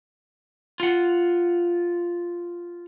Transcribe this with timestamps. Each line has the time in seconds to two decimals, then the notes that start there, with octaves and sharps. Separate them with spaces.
0.80 F4 F#5